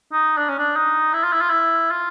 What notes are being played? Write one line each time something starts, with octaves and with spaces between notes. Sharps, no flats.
D#4
D4
C#4
D4
D#4
E4
F4
E4
F4
E4
F4